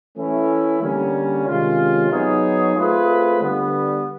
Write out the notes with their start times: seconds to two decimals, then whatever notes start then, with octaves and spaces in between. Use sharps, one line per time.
0.16 E3 A3 C#4 E4
0.81 D3 G3 A#3 C#4
1.46 C3 D#3 G#3 C#4 F4
2.10 F#3 B3 D#4 G#4 C#5
2.74 A3 C4 F4 G#4 B4
3.39 D3 G3 B3